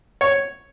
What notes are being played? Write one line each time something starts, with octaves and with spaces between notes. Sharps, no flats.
C#5